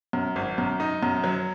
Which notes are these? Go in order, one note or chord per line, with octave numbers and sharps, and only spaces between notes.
F#2
G#1
F#2
D#4
F#2
F#3